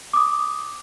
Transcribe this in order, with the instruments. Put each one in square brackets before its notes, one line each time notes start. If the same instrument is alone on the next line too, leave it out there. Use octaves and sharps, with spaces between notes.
[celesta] D6 D#6